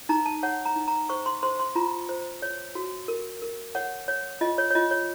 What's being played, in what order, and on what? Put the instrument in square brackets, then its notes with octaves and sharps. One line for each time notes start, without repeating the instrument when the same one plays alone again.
[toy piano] D#4 A#5
A5
C#5 F#5
A#5
D#4
A#5
C5 C#6
C6
C5 C6
C6
F4 A#5
C5
C#5
F#4
A#4
A#4
C#5 F#5
C#5
F4 D#5
C#5
C#5
F4 D#5
C#5